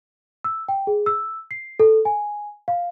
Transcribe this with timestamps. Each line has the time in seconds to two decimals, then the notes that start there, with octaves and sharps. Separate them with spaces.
0.44 E6
0.68 G5
0.87 G#4
1.06 E6
1.51 C7
1.80 A4
2.05 G#5
2.68 F5